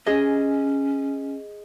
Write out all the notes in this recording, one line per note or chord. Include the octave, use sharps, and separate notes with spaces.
C#4 G#4 D#5